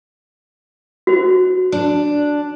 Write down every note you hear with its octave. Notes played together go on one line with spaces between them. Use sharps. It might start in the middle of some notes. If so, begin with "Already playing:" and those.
F#4 C5
D4